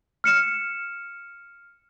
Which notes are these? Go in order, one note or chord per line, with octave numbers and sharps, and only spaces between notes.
F6 C#7 E7